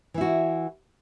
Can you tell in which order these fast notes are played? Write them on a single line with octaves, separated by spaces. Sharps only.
E3 E4 F#4